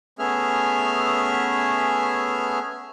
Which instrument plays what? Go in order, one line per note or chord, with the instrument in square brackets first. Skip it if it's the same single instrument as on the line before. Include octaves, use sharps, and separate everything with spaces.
[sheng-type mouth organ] A3 B3 C#4 G#4 E5 F6